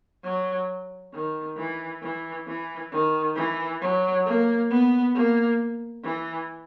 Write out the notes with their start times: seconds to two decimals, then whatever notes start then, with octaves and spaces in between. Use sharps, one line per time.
0.24 F#3
1.14 D#3
1.57 E3
2.02 E3
2.47 E3
2.92 D#3
3.36 E3
3.81 F#3
4.26 A#3
4.70 B3
5.15 A#3
6.04 E3